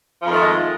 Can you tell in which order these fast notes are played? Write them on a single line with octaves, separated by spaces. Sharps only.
F3 F2 D#3 A3 G#3